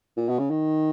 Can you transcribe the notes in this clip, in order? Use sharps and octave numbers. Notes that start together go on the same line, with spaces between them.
A#2
B2
C#3
D#3